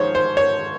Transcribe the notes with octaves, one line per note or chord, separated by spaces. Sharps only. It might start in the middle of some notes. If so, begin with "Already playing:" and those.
Already playing: G#2 F3 C5 C#5
C5
C#5